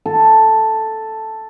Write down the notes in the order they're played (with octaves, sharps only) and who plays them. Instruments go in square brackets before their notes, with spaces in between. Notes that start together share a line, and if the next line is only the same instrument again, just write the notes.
[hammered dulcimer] A4